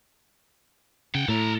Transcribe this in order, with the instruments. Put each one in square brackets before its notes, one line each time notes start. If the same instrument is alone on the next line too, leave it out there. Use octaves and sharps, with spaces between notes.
[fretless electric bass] C#3 [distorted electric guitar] F#5 G5
[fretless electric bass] A2 [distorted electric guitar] A4 A#5